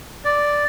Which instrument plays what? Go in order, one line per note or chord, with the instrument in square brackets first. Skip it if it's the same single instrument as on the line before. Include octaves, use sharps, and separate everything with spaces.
[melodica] D5